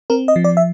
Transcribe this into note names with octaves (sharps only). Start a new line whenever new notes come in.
C4 A#4
D#5
F3
D5
E5